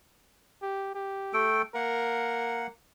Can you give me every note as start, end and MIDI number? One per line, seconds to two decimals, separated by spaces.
0.62 0.94 67
0.95 1.47 67
1.33 1.62 57
1.33 1.62 69
1.33 1.62 79
1.75 2.67 58
1.75 2.71 70
1.75 2.67 78